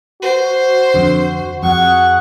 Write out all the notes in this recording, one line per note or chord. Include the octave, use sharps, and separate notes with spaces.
F#4 C5
F2 D3
F2 G#4 F#5 C#6